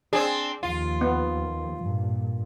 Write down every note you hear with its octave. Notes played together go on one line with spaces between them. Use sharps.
C4 D4 G#4
D#2 F3 F4
B3
G2 A#2